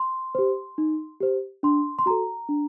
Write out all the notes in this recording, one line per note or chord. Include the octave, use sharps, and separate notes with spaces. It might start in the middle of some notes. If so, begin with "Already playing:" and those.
Already playing: C6
G4 C5
D#4
G4 C5
D4 C6
C6
F#4 A4 A#5
D4